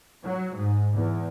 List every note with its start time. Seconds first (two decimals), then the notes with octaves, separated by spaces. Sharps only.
0.22 F#3
0.54 G#2
0.93 E2